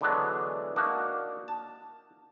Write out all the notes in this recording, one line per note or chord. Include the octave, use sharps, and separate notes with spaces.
D3 E3 F#3 G#3 B3 D4
A#3 D4 D#4 F#4
A5